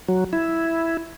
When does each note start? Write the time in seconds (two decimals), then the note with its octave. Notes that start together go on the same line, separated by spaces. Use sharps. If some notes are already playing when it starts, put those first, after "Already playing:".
0.09 F#3
0.33 E4